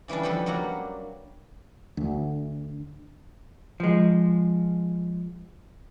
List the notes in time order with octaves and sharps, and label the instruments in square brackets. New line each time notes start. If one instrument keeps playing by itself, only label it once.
[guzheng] C#3 E3 G3 C#4 D4
F2 A4 B4 F#5 G5
F#3 G3 A#3 F#4 F#5
[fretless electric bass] D2
[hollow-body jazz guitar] F3 G#3